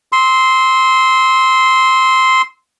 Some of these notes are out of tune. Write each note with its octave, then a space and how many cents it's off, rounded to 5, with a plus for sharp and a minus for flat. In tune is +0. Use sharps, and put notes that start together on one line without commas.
C6 +0 E6 -30